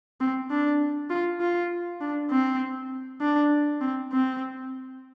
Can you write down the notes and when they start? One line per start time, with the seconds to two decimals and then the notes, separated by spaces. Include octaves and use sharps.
0.21 C4
0.51 D4
1.10 F4
1.41 F4
2.01 D4
2.31 C4
3.21 D4
3.81 C4
4.12 C4